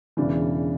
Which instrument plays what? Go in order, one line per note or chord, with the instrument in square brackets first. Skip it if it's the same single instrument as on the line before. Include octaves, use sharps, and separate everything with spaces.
[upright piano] E1 E2 C#3 E3 D4